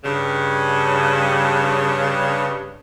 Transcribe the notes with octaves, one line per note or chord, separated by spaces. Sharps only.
G2 C#3